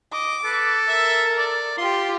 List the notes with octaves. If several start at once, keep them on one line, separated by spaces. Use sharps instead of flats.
D#5 D6
A4 B4
A#4 E5
D5
F4 G4 C6